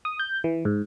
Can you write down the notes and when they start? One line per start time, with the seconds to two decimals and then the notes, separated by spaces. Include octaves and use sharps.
0.05 D#6
0.19 G6
0.44 E3
0.65 G#2